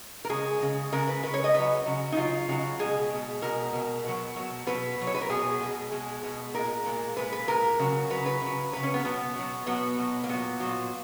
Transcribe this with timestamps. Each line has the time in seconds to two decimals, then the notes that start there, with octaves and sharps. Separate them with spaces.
0.25 A#4
0.30 C#3 G#3 G#4
0.60 C#3 G#3
0.92 C#3 G#3 A#4
1.08 B4
1.23 C#3 G#3 B4
1.34 C#5
1.44 D#5
1.54 C#3 F#3 B4
1.86 C#3 F#3
2.12 D#4
2.17 C#3 F#3 F4
2.48 C#3 F#3
2.79 B2 G#3 G#4
3.10 B2 G#3
3.42 B2 G#3 A#4
3.73 B2 G#3
4.05 B2 F#3
4.36 B2 F#3
4.67 B2 F#3 B4
4.98 B2 F#3
5.07 C#5
5.15 B4
5.21 A#4
5.29 B2 G#3 G#4
5.60 B2 G#3
5.92 B2 G#3
6.23 B2 G#3
6.55 A#2 G#3 A#4
6.86 A#2 G#3
7.17 A#2 G#3 B4
7.33 B4
7.47 A#2 G#3 A#4
7.79 C#3 F#3
8.10 C#3 F#3 B4
8.26 B4
8.42 C#3 F#3
8.73 C#3 F#3 B4
8.83 C#4
8.94 B3
9.04 B2 F#3 B3
9.36 B2 F#3
9.66 B2 F#3 B3
9.98 B2 F#3
10.24 A#3
10.29 A#2 F#3 B3
10.60 A#2 F#3